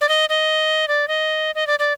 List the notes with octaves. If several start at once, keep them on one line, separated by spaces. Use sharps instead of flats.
D5
D#5
D#5
D5
D#5
D#5
D5
D5